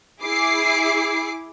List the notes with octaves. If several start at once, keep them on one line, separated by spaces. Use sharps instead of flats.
E4 G#4 D6 C7